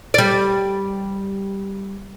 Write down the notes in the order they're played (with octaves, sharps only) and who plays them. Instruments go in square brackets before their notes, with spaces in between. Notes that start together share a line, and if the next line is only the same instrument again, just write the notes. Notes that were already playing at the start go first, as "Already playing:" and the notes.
[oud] G3 D5